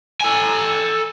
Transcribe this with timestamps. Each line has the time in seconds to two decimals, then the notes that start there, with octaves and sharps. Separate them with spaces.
0.21 A4 G#5